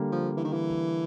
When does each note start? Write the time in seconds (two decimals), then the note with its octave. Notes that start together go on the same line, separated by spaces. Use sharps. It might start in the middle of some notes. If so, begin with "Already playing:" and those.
Already playing: D3 G3 A#3
0.12 F3
0.37 E3
0.45 D#3
0.53 E3